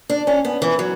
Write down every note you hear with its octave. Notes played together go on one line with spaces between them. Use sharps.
D4
C#4
B3
E3
F#3